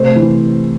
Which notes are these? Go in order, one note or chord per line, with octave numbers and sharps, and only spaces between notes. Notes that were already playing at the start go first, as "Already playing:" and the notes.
Already playing: C3 A3 C5
E3